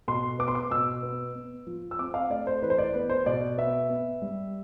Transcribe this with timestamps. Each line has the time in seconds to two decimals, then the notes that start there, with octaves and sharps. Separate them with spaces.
0.08 B2 C6
0.39 B3 D6
0.48 C6
0.55 D6
0.71 B2 E6
1.03 B3
1.35 B3
1.67 F3
1.91 E6
1.99 C4 D6
2.14 F5
2.30 A3 D5
2.47 C5
2.62 E3 B4
2.70 C5
2.78 D5
2.94 B3 B4
3.10 C5
3.26 B2 D5
3.57 B3 E5
3.90 B3
4.22 G3